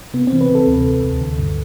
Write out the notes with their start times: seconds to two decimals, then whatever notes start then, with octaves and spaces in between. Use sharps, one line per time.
0.14 C3 B3
0.27 C4
0.32 E3
0.41 B4
0.49 C3
0.55 A4
0.67 D2
0.85 D2
1.03 D2
1.21 D3
1.39 G2